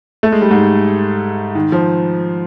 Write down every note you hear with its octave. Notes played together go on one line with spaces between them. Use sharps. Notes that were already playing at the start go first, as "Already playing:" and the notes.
A3
G#3
G3
G#2 G#3
D#3
F3